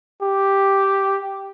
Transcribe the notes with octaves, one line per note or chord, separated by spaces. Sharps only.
G4